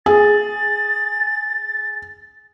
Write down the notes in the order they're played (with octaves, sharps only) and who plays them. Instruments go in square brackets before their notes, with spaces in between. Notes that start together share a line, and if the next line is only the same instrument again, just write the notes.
[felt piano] G#4 [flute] A6